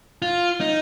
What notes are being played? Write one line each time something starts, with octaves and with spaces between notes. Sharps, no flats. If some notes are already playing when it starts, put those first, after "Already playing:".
F4
D#4